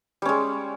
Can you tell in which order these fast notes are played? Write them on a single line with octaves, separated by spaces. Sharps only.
G3 C#4 G#3